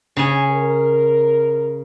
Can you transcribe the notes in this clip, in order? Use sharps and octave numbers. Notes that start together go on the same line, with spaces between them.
C#3 G#5
A#4